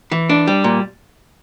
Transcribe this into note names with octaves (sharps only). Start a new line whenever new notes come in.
E3
D4
G3
A#2